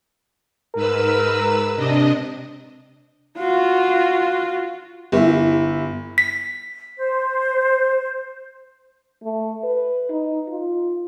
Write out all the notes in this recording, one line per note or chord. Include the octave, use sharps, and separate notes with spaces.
G#2 A#4 B4 E6
C3 D4 D#5
F4 F#4
G1 E4
B6
C5
A3
B4
D#4
F4